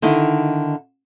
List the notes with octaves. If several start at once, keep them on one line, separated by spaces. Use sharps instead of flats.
D3 D#3 D#4 E4